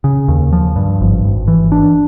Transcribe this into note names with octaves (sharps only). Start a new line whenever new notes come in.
C#3
D#2
F3
G2
G#1
G#1
E3
D4